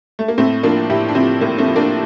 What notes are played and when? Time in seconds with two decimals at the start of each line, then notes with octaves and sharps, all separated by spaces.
0.19 A3
0.28 A#3
0.38 A2 A3 C4
0.63 F3 A#3 D4
0.90 A2 E4 G4
1.08 D4
1.15 F3 C4 E4
1.41 A2 A#3
1.58 A3 C4
1.67 F3
1.76 A#3 D4